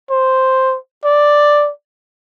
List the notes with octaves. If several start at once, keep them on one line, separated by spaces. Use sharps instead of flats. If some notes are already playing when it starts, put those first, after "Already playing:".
C5
D5